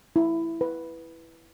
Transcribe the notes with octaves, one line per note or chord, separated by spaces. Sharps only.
E4
B4